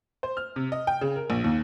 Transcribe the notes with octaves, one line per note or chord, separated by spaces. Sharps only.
C5
F6
C3
D#5
G5
C#3
A#4
A#1
D#2